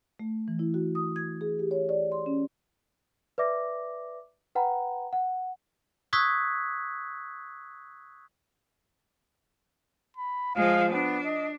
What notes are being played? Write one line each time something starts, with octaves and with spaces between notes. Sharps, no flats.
A3
E3
E4
F#4
D#6
G#6
G#4
G4
C#5
D5
C6
C#4
B4 D5 E5 D6 A#6
B4 F#5 G5 A#5 B5
F#5
C#6 D#6 E6 F#6 G#6 B6
B5
F3 G#3 F5
B3 D4
D#5